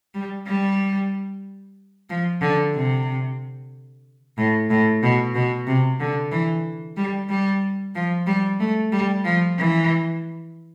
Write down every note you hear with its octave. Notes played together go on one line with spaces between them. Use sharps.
G3
G3
F3
D3
C3
A2
A2
B2
B2
C3
D3
E3
G3
G3
F3
G3
A3
G3
F3
E3